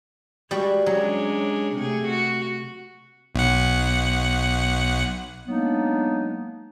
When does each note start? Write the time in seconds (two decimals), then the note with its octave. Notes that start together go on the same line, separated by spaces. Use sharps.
0.51 G3 G#3 F#4
0.86 F#3 G#3 C#4 D4
1.75 C3 A3 G#4
2.07 F#4
3.35 B1 F#5
5.48 F#3 G#3 A#3 B3 D4 D#4